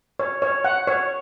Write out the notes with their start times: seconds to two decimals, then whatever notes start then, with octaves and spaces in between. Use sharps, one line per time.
0.19 C#5
0.42 C#5
0.65 F#5
0.87 C#5